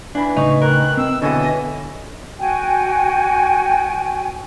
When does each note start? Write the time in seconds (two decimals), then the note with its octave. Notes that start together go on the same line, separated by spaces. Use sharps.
0.15 E3 D4 B5
0.37 A2 C#3 D#4 C#6
0.62 D#3 A#4 F#6
0.97 C4 E6
1.22 B2 D3 E3 A4 C#5 D#5 F#5
2.39 F#4 G5 G#5